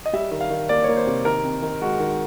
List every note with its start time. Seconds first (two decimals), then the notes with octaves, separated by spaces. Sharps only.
0.06 D#5
0.13 G3 E5
0.31 D#3
0.41 F5
0.50 D#3
0.69 A#3 D5
0.84 C#5
0.89 A#3
0.97 C5
1.07 C3
1.25 D#3 A#4
1.45 C4
1.62 D#3
1.82 G#3 F#4
2.00 D#3